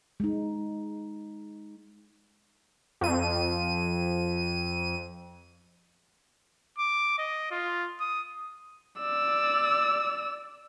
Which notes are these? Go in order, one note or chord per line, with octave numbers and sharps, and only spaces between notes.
G#3 D#4
F2 D#7
D6
D#5
F4
D#6
D5 E6